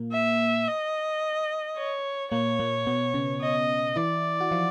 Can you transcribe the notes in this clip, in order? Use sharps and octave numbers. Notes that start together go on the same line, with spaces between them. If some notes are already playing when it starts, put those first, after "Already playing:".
Already playing: A#2 A#3
E5
D#5
C#5
A#2 A#3 C#5
A#2 A#3
B2 B3
C#3 C#4
D#5
E3 E4 D5
F#4
F3 F4